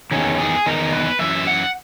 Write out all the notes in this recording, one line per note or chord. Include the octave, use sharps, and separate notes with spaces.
E2 D#3 C#4
G#4
E2 D#3 A#4
B4
F#2 E3 E5
F#5